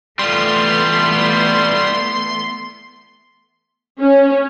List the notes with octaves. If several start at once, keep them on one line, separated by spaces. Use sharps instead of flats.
E3 G3 A3 B3 F4 C6
C#4